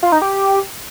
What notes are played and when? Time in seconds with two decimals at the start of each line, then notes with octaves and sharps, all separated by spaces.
0.03 F4
0.12 D#4
0.22 G4